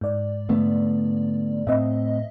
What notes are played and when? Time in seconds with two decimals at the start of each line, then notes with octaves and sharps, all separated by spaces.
0.01 G#2 D5
0.49 D3 A3 B3
1.67 A2 C4 D#5 E5